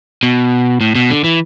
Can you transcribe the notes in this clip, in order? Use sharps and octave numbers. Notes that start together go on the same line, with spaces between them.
B2
A2
B2
D3
E3